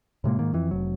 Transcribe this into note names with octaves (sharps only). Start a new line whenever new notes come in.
A2 C3 G#3 A#3
G#2 D#3 A#3
F2 E3
F1 F#3